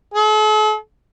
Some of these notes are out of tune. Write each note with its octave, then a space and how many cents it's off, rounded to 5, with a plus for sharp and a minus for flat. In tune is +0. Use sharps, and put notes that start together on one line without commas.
A4 -45